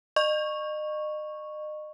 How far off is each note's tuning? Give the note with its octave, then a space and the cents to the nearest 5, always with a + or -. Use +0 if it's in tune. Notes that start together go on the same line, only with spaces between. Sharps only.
D#5 -35 C#6 -5